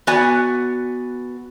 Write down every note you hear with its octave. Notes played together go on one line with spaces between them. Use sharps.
B3 F#4 D5 G#5